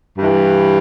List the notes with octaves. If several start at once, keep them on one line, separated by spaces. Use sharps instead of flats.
G2 E3